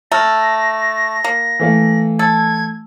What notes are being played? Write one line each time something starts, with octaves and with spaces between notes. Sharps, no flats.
A3 A#5 F6 A#6
A#3
E3 A3 F5
A4 G#6